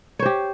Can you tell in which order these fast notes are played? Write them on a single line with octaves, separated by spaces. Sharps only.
C#5 C5 G4